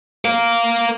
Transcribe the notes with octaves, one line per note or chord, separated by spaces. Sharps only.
A#4 F5